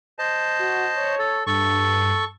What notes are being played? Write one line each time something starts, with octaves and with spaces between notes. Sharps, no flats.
C5 D#5 A5
F#4
C#5
A4
G2 A4 C#6